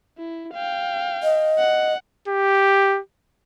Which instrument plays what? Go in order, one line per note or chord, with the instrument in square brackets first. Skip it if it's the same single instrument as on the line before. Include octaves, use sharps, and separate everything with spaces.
[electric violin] E4
F5 G5
[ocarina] D#5
[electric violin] F#5
[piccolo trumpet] G4